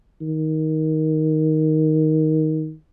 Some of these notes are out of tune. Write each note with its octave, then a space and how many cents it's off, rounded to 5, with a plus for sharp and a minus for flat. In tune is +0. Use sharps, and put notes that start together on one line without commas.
D#3 +10